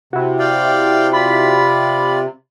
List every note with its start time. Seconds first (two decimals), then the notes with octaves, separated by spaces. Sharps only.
0.13 C3 E4 F#4
0.39 D5 F5 G5
1.13 F4 D5 B5